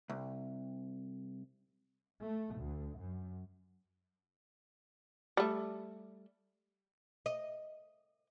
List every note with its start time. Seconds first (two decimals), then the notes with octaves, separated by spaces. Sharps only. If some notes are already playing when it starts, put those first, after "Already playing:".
0.09 C2
2.23 A3
2.57 D2
2.98 F#2
5.37 G3 A3
7.26 D#5